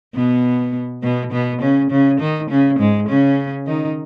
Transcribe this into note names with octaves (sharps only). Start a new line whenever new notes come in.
B2 B3
B2 B3
B2 B3
C#3 C#4
C#3 C#4
D#3 D#4
C#3 C#4
G#2 G#3
C#3 C#4
D#3 D#4